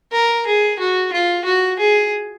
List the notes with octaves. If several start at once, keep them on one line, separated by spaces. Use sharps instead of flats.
A#4
G#4
F#4
F4
F#4
G#4